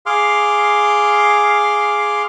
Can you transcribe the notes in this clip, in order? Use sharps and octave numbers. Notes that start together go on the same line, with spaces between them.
G#4 F5 C6 D6 F6